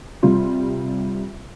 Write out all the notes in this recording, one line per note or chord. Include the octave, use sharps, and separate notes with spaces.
C3 G3 F4 C6